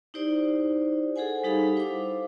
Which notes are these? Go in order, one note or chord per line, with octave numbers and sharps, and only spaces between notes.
D#4 E4 G4 C5 D5
G#4 A4 C5 F#5 G#5
G3 D#4 G4 A4 F5 B5
E4 C5 F5 D6